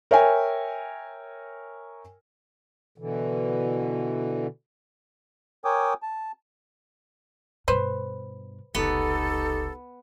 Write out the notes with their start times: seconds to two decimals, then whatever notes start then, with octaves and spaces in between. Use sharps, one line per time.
0.11 A#4 C#5 E5 G5 G#5
2.98 B2 D3 E3
5.65 A#4 C#5 G5 G#5 D6 D#6
6.02 A5
7.68 G2 B2 B4 C5
8.75 F1 C#2 B3 D#4 G4 A4